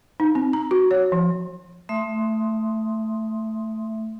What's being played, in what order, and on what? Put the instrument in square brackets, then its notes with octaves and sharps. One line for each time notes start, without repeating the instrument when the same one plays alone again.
[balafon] D#4
C4
A#5
F#4
C#5
F3
[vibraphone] A3 E5 C6 D#6